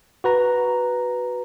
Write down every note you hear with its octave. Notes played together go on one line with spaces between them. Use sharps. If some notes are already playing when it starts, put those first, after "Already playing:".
F#4 B4 A#5